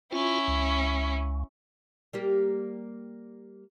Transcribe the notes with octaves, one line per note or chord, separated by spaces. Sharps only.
C#4 E4 F4
C#2
G3 A#3 G4